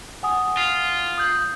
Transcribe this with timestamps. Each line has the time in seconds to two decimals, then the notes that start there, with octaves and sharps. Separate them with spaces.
0.23 F#5 G#5 D#6
0.57 F4
1.18 D#6 G6 F#7